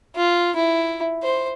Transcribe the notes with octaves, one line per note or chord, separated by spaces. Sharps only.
F4
E4
C5